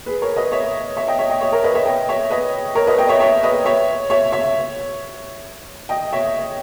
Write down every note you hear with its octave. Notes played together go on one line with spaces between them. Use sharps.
G#4 B4
A#4 C#5
B4 D#5
C#5 E5
C#5 E5
D#5 G5
C#5 E5
D#5 G5
C#5 E5
A#4 C#5
B4 D#5
C#5 E5
D#5 G5
C#5 E5
B4 D#5
A#4 C#5
B4 D#5
D#5 G5
C#5 E5
C#5 E5
B4 D#5
C#5 E5
C#5 E5
C#5 E5
D#5 G5
C#5 E5